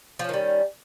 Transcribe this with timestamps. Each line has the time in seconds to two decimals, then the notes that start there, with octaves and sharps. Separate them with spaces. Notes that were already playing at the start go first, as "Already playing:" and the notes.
0.19 F3
0.24 C#4
0.29 D#3
0.34 G3